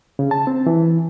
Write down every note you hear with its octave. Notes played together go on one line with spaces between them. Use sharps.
C#3
A5
C4
E3